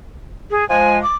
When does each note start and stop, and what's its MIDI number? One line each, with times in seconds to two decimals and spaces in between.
0.51 0.67 68
0.69 0.99 53
0.69 0.99 56
0.69 1.01 80
1.03 1.16 86